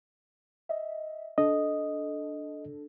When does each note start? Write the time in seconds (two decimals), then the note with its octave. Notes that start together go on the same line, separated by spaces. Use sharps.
0.69 D#5 E5
1.38 D4 A4 D#5